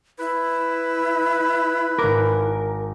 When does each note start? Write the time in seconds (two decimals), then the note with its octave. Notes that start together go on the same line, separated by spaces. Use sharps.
0.19 E4 B4
1.99 G#1 A#4 D6